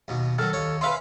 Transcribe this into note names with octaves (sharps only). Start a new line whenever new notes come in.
D#2 B2
D#3 F#3 A4 F6
D#2 C#5
C#4 B4 E5 F5 B5 C6